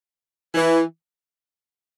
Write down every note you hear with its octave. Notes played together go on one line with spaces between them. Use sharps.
E3